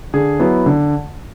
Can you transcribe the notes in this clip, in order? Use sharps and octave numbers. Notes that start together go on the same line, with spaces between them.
D3 G#4
F#3 B3 E4
D3